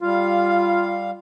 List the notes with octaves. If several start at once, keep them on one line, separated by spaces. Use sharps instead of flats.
G3 F4 F5